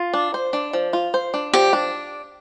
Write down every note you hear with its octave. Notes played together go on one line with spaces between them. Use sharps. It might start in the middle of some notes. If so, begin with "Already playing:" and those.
Already playing: F4
D4
C5
D4
F3
F4
C5
D4
F3 G4
D4